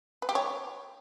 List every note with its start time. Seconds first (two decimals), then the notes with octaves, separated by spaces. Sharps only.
0.22 B4
0.29 G4
0.35 C#5